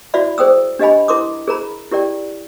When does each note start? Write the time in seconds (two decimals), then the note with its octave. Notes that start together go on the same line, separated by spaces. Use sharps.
0.14 E4 F#4 D5 E5 F5 B5
0.38 G#4 C5 G5 D#6 E6
0.79 D4 G4 D#5 F5 G#5 B5
1.08 E4 A#4 C6 D6 D#6
1.48 G#4 A#4 A#5 B5
1.91 E4 G4 A#4 D5 G5